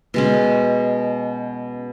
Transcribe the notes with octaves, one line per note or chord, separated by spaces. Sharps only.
B2 G#3 C#4